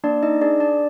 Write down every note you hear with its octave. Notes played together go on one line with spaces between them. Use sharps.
A#3 D4 D5
D#4 D#5
D4 G#4 D5
D4 D5